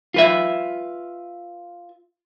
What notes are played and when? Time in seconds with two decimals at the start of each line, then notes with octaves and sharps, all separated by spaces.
0.14 F4 B4 E5